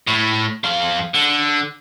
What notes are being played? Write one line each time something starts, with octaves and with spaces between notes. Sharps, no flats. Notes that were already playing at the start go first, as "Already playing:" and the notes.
A2
F2 F5
D3